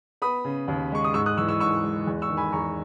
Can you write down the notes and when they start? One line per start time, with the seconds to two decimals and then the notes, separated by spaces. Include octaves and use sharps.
0.22 B3 B5 D#6
0.45 C#3
0.68 D#2
0.92 G#3 C#6
1.04 D#6
1.14 G#2 C#6 E6
1.26 D#6 F#6
1.37 E3 C#6 E6
1.49 C#6 E6
1.60 G#2 C#6 E6
1.83 G#3
2.07 E2
2.22 C#6 E6
2.29 D#3
2.37 G#5 B5
2.53 E2 A#5 C#6